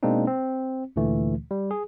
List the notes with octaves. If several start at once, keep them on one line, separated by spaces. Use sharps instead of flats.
B2 G#3 A#3 C4 D4 D#4
C4
D2 A#2 D3 E3 A3
G3
G#4